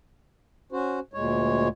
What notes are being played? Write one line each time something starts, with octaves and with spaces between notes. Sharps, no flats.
C#4 F#4 C5
D2 A#2 G#3 C#5